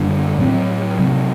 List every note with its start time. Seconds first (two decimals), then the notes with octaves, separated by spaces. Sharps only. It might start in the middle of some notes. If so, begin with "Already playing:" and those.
Already playing: F#2 D3 G3 D4
0.38 A2 F#3 C4
0.99 C3 F#3 C4